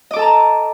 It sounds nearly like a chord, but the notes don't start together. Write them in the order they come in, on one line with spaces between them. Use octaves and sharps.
D#5 D6 A4 A5 A#5